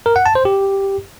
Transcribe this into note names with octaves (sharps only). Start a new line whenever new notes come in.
A#4
F#5
A5
C5
G4